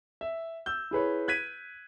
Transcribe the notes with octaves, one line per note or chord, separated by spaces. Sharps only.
E5
E6 G6
E4 G#4 B4 C#5
F#6 G#6 B6 D#7